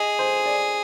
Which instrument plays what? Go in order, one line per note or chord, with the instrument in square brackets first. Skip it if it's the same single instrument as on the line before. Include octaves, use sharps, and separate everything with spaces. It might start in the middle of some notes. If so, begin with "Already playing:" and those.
Already playing: [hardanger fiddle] G#4 [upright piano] D#5
[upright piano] C5
D5